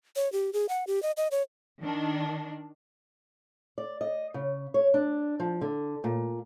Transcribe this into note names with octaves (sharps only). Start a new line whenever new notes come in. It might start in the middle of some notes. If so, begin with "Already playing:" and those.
C#5
G4
G#4
F#5
G4
D#5
D#5
C#5
D#3 D4
D5
D#5
C#3
C#5
D4
F3
D3
A#2